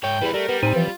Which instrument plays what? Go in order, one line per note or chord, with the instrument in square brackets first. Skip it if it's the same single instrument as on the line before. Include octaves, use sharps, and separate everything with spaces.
[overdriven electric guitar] G#2 C#5 [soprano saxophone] G5
[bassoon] E2 [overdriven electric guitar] G3 E4
[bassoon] G3 [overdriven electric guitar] A3 [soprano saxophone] A#4
[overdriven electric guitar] G3 [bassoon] B3
[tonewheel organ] A2 D#4 G#5 [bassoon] C4
[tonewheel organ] E3 F3 [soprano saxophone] F4